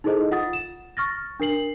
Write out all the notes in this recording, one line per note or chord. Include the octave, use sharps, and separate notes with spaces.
D#4 E4 G#4 A4 C5 D#5
F4 F#5 D#6 A6
E7
C#6 F6 A6 A#6
D4 A#4 C7 F#7